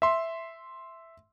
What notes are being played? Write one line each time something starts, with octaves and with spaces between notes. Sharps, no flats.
E5 C6